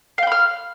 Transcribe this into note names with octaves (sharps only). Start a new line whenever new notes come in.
F5 G5 B5 F6